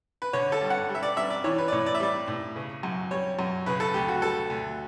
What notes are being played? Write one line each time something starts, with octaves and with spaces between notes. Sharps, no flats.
B4
D3 C#5
A4
G2
F#5
G3
E5
D5
G2 E5
D5
E3 C#5
B4
D5
A2 C#5
D5
E5
G3 D5
A2
C#3
F#2
G3 C#5
F#2
C#3 B4
A4
D2 G4
F#4
G3 A4
D2